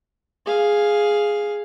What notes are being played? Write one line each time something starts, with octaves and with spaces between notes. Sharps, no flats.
G#4 F5